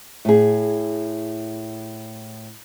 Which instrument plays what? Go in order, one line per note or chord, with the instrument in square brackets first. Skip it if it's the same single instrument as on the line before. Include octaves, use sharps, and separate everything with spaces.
[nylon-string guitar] A2 G#4